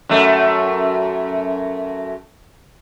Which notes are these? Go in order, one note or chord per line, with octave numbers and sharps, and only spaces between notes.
F#2 A3